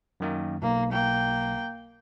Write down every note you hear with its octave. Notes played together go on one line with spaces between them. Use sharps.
F#2 D#3 A#3
B1 A#3
A#3 G5